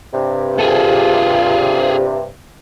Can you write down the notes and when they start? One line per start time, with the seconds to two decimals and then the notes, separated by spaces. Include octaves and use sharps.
0.14 G2 C3
0.59 F4 G#4 A4